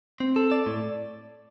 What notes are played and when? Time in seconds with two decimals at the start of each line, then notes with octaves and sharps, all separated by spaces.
0.20 C4
0.36 A4
0.51 D5
0.66 A2